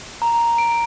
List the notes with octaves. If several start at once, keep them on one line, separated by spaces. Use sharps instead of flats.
A#5
D7